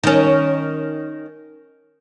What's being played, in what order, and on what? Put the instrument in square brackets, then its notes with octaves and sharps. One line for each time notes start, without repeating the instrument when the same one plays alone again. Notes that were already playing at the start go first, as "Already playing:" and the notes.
[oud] D#3 C#4